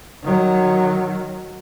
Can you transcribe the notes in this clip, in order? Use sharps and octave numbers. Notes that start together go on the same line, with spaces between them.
D#3 F#3